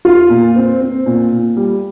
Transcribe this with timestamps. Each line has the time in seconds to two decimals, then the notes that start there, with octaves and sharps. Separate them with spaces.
0.05 F4
0.30 A#2
0.56 C4
0.80 C4
1.06 A#2
1.31 A#2
1.57 G3